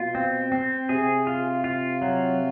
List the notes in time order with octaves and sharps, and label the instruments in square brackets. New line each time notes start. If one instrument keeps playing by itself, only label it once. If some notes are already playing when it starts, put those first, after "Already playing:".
Already playing: [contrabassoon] B2 [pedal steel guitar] F4
[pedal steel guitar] C4
C4
[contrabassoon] C3 [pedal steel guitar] G#4
[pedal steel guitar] F4
F4
F#3